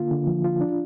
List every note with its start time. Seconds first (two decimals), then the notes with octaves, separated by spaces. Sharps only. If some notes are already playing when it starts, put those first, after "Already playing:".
Already playing: D3 A#3 F4
0.11 D3
0.27 F3
0.44 F4
0.61 D4